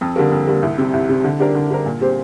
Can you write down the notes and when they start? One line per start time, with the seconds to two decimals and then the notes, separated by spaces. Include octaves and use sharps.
0.01 F2
0.16 D3 G3 A#3
0.32 F2
0.47 D3 G3 A#3
0.62 C2
0.78 C3 G3
0.93 C2
1.09 C3 G3
1.24 D3
1.40 G3 D4 G4 A#4
1.55 D3
1.70 G3 D4 G4 A#4
1.86 A#2
2.01 G3 C4 G4 C5